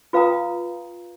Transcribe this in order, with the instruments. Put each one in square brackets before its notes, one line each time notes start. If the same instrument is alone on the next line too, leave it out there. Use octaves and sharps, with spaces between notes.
[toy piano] F4 B4 F5 G5 A#5 D#6